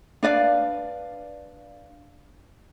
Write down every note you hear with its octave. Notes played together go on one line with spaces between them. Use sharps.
D4 B4 D5 F5